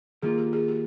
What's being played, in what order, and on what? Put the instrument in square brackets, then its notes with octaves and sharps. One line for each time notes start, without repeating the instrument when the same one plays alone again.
[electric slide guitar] D#3 A#3 F4 [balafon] G#4
[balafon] G4
G#4
G4